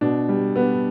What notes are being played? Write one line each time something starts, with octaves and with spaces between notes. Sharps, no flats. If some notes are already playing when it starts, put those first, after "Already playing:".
B2 D4
G3
B3